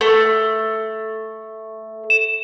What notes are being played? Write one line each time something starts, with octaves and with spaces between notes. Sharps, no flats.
A3
E7